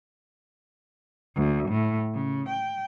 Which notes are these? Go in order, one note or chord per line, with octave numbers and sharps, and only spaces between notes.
D2
A2
C#3
G5